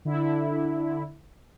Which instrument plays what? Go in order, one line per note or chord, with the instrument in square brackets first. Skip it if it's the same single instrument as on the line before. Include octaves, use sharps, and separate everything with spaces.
[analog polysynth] D3 E4